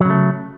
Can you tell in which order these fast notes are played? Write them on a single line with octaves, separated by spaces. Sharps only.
F#3 C#3 A3